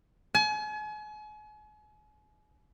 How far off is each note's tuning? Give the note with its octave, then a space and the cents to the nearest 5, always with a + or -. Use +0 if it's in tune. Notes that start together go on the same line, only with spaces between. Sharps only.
G#5 +40